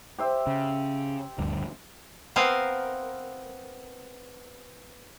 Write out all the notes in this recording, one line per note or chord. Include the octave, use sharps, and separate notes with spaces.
G4 C5 E5
C#3
D#1 D2 G2
B3 C4 A#4 F5 G#5